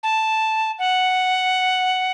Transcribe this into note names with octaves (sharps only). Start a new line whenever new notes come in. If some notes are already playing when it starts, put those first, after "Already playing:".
A5
F#5